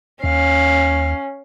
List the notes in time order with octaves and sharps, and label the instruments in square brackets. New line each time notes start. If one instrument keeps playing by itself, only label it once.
[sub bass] D#2 [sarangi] C#4 [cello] F5